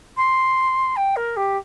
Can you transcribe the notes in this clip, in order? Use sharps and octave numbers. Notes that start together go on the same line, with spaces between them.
C6
G5
A#4
G4